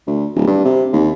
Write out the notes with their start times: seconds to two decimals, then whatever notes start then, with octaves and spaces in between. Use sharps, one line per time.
0.07 D2
0.36 D1
0.47 G2
0.65 C3
0.93 D#2